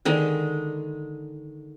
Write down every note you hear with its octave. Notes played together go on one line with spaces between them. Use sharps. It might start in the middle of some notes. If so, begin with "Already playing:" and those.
D3 D#3 G#3